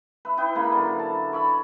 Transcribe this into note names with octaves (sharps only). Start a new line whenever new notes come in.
B4 E5
E4 B4 D#5 G5
C#3 A#3 B5
D3 F#3
A5
C#5 D5 E5 B5